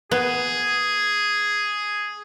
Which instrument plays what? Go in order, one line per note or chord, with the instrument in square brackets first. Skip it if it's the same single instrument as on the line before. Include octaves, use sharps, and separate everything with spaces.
[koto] B3 [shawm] G#4